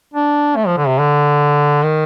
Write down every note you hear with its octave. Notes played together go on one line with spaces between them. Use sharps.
D4
A3
F3
D3
C3
D3
D#3